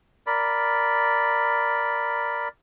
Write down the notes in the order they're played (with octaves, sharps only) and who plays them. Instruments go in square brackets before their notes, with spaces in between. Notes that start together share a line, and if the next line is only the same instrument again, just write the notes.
[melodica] A#4 D5 B5